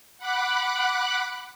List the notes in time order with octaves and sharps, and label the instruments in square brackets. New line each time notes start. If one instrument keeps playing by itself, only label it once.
[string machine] F#5 B5 D6 F#6